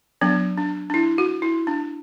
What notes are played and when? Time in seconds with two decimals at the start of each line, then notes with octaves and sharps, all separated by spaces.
0.21 F#3 B3 D4
0.57 D4
0.90 D4
0.94 E4
1.18 F#4
1.42 E4
1.67 D4